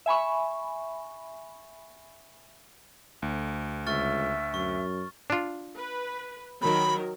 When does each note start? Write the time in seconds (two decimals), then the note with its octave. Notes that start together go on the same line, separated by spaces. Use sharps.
0.06 E5 G#5 B5 C#6
3.22 D2
3.87 C#2 E5 C#6 F6 A6
4.54 F#2 C#6
5.30 D4 F4
5.75 B4
6.62 D#3 F#3 A#4 B5